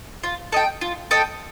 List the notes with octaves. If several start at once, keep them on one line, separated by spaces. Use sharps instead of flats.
F4
A4 D#5 G5
F4
A4 D#5 G5